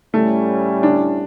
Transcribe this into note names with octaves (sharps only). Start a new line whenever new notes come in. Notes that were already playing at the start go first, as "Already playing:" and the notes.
A2 G3 A3 C#4 E4
D4